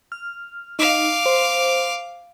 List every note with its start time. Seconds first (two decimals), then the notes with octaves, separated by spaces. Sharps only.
0.12 F6
0.79 D#4 F5 D6
1.26 C5